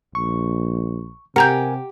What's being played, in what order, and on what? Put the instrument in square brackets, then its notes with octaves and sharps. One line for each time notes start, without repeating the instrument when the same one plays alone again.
[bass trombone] A#1 [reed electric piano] C#6
[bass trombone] C3 [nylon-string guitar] G4 [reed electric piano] A#4 G#5 [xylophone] F#5 A#5 G6